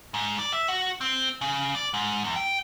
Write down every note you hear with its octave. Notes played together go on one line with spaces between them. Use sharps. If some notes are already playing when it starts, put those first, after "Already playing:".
G#2
D5
E5
F#4
C4
C#3
D5
G#2
E2
G5